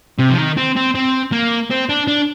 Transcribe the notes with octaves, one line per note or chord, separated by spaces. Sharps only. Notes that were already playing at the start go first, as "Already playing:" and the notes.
C3
F3
D#3
C4
C4
C4
A#3
C4
D4
D4